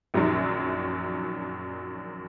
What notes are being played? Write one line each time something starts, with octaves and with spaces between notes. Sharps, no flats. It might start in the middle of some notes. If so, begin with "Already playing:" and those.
A#1 F#2 D#3 F#3